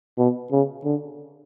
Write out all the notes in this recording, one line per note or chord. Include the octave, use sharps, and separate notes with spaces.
B2
C#3
D3